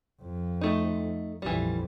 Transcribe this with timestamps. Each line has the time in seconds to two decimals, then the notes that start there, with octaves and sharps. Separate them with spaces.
0.22 F2
0.61 A3 D#4
1.42 A#1 F2 E3 G3